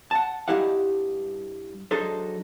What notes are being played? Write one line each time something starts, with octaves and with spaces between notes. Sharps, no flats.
F#5 A5
G2 D#4 E4 G4 F5 F#5
F#3 D4 D#4 G#4 A4 C5